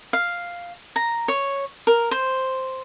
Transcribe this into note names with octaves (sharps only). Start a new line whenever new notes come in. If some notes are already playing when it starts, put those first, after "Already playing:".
F5
A#5
C#5
A#4
C5